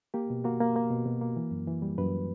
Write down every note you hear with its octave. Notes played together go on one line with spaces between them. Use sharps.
A#3 G4
B2
A#3 F#4
A#3
A#3
B2
B2
A#3
E3
F#2
E3
G3
F#2 B4